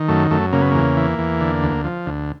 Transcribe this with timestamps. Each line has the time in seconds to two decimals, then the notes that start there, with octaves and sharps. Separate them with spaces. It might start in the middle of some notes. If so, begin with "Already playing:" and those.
Already playing: D#3
0.08 F#2 A3
0.31 F#2 A3
0.52 C#3 A#3
0.62 B3
0.71 E2 A#3
0.97 E3
1.19 E2
1.41 D3
1.62 D2
1.84 F3
2.06 D2